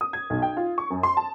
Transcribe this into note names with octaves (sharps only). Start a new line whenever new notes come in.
D#6
G#6
B1
G5
F4
C#6
F#2
C6
A5